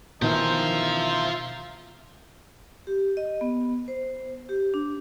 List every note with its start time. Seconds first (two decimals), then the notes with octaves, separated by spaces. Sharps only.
0.22 B2 D#3 E3 F4 C5 E5 A#5
2.87 G4
3.17 D#5
3.41 B3
3.88 C5
4.49 G4
4.74 D4